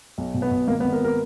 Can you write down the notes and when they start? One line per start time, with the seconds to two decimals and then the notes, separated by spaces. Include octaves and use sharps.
0.18 B1
0.34 B2
0.42 B3
0.51 B2
0.67 G#1 A#3
0.80 B3
0.84 G#1
0.92 A#4
1.04 A#4